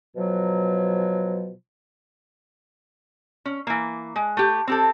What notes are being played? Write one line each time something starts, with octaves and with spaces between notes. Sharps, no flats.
B2 F3 F#3
C#4
E3 A#3
G#3
A3 G4
C4 G4 A4